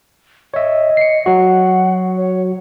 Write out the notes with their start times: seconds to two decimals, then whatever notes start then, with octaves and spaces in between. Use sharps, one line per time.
0.54 C#5 D#5 E5
0.97 C7 C#7
1.26 F#3 F#4 F#5
2.17 C#5